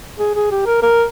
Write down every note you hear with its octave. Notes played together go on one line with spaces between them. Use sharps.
G#4
G#4
G4
A#4
A#4